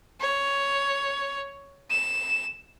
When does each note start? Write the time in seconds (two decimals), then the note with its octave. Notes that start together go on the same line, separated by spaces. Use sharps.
0.21 C#5
1.91 E7